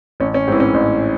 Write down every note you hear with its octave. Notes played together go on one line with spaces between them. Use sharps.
A1 C#4
C#4
G#2 E3 C4
C#4
A1